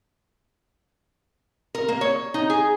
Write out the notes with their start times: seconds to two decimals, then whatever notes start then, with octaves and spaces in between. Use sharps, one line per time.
1.75 A#4
1.88 A#3
2.01 C#5
2.34 D#4
2.50 G#4